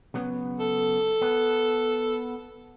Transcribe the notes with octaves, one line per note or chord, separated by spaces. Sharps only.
C#3 F#3 B3
A4
B3